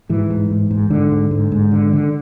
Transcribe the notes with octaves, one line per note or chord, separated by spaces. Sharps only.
G#2 E3
G#2
G#2
G#2
G#2 D3
G#2
G#2
G#2
D3
D3